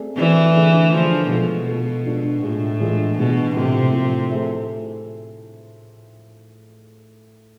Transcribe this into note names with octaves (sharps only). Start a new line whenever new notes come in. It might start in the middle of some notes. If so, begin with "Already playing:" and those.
Already playing: A3 C4 G#4 D5
E3 A3 C4 G#4 D5
D3 A3 E4 G#4
D3 F3 A3 E4 G#4
B2 G#3 B3 F4 A4
G#3 B3 F4 A4
G#3 D4 F4
A2 G#3 D4 F4
E3 G#3 D4 F4
B2 E3 G#3 D4 F4
A2 C3 F3 A3
A2 F3 A3
A3 E4 G#4 C5 E5